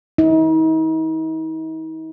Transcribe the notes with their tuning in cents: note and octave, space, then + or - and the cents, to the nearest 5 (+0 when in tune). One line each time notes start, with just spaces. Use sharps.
D#4 +45